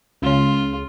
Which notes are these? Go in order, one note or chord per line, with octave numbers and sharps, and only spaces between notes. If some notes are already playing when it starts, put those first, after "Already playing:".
C#2 C#3 F4